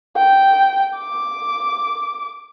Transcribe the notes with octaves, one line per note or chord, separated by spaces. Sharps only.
G5
D6